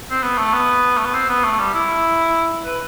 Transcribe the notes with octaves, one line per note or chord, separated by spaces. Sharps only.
C4
B3
A3
B3
A3
B3
C4
B3
A3
G3
E4
B4